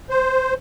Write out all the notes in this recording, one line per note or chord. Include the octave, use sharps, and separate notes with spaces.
C5